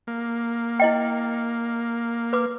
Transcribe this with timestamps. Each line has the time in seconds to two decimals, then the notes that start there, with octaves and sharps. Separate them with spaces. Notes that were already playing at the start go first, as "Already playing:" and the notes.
0.07 A#3
0.80 E4 D#5 G5
2.33 B4 D6